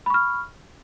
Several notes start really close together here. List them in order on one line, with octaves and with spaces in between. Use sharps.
B5 C#6 F6